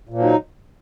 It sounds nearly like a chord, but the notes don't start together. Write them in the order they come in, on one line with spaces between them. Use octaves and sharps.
A#2 F3 F#3 D#4